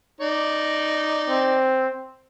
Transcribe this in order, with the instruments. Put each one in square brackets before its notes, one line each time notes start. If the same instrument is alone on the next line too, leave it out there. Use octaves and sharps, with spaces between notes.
[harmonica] D#4 D5
[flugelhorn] C4